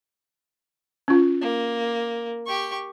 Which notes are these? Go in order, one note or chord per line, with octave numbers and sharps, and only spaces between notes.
C#4 F4
A#3
G4 C#6